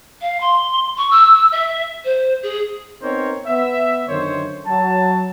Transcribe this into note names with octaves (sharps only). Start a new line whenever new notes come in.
F5
C6
C#6
E6
E5
C5
G#4
B3 C4 D#4 A#4 C5 C#5
B3 E5
F#2 D3 D#3 C5 C#5
F#3 A5